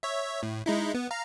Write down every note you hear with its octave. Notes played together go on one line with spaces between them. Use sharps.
C#5 E5
A2
G#3 D#4 E4
B3
F5 A#5